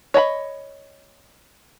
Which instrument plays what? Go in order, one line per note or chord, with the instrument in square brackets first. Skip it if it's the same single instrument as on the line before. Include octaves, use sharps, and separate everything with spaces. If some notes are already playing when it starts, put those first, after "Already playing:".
[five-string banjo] C#5 D#5 A#5 B5